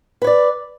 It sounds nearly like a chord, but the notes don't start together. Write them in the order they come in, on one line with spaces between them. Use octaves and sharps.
B4 C#5 D5